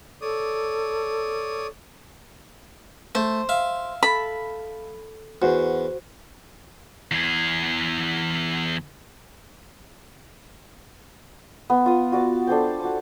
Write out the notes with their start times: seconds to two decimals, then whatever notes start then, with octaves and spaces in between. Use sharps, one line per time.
0.22 A4 C#5 D5 D#6
3.15 A3 C5
3.49 E5 F5
4.03 A4 B5
5.42 E2 F#4 C5
7.11 E2 G#4
11.70 B3
11.86 F4 D#6
12.12 F#4 D5 D6
12.47 D4 A4 C5 G5
12.81 F#4 D6